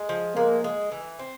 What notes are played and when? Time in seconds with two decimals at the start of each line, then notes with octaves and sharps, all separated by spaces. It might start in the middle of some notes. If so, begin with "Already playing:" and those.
Already playing: G#3
0.09 F3
0.36 G#3 A#3
0.64 G#3
0.92 E3
1.19 C4